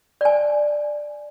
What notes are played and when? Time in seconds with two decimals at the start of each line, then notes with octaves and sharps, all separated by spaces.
0.21 D5 G#5